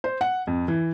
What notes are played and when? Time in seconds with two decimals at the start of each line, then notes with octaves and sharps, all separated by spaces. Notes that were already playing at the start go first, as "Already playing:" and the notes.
0.04 C5
0.21 F#5
0.47 F2
0.68 E3